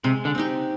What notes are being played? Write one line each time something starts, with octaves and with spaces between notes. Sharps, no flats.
C3 G#3
D3
C4 D#4 G4